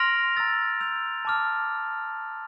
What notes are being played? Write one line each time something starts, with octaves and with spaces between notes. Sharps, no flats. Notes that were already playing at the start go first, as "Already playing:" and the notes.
Already playing: C6 F6 A#6 D7 F7
A#5 E6 A6
E6 G6 A#6 F7
A5 D6 F6